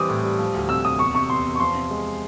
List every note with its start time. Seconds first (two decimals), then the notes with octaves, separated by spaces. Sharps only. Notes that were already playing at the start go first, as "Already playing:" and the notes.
Already playing: E3 G3 C4 D6 D#6
0.09 A2
0.23 G3
0.39 F3
0.54 D2
0.69 C3 E6
0.84 C3 D#6
0.99 E2 C#6
1.15 C3 C#6
1.29 E2 C6
1.45 E2
1.55 C#6
1.60 F3 C6
1.75 C3
1.91 G#3